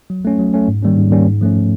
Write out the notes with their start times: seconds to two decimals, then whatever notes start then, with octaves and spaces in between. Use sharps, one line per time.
0.10 F#3
0.25 A3 C#4
0.39 F#3
0.54 A3 C#4
0.68 G#2
0.83 D#3 G3 A#3 C#4
0.98 G#2
1.11 D#3 G3 A#3 C#4
1.27 G#2
1.41 F3 A3 C#4